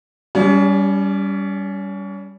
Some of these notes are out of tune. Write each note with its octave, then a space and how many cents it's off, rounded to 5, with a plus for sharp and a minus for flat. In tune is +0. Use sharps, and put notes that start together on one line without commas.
G3 +0 C#4 +35 G4 +40